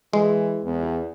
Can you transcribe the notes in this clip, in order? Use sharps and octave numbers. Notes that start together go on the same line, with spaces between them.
E3 G#3
E2